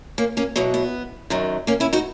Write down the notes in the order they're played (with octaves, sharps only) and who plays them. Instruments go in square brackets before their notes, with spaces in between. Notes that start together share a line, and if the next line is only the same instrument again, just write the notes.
[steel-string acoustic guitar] A#3 C#4
A#3 C#4
E2 B2 F#3 B3
B3
F#2 D#3 F#3
A#3 C#4
C#4 E4
D#4 F#4